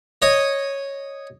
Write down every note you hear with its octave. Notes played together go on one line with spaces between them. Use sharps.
C#5 D#5 D#6